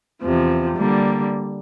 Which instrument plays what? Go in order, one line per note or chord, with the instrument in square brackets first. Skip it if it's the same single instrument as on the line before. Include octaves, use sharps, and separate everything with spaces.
[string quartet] E2 C3 F3
D3 G3 A#3